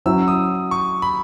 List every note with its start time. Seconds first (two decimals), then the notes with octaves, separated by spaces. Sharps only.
0.06 F#3 C#4 E4 E6
0.28 D#6
0.71 C#6
1.02 B5